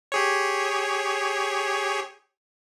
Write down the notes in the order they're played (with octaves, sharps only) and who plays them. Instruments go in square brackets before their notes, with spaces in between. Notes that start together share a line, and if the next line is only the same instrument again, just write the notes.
[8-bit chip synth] G4 G#4 C#5